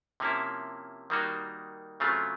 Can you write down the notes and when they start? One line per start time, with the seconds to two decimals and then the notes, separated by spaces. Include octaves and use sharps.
0.20 C3 F3 A#3 C#4 E4
1.10 D#3 G3 A#3 D#4 F#4
2.00 C#3 F#3 A3 C4 F4